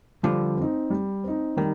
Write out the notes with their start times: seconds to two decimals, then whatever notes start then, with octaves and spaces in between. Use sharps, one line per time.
0.23 D3 F3 G3
0.57 C4 D#4
0.90 G3
1.24 C4 D#4
1.57 D#3 G3